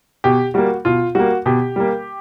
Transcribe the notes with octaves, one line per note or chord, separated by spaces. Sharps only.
B2 G4
G3 A#3 F#4
B2 F4
G3 A#3 F#4
B2 G4
G3 A#3